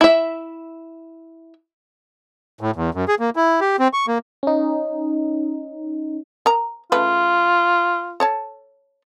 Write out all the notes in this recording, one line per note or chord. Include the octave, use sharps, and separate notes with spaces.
E4 E5
A2
E2
F#2
G#4
A#3
E4
G4
C4
C#6
A#3
C#4 D#4
A#4 A#5
C#3 A3 F4 B4
A4 C#5 A5